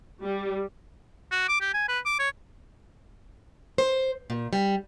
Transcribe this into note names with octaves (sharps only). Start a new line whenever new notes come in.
G3
F#4
D6
G4
G#5
B4
D6
C#5
C5
A#2
G3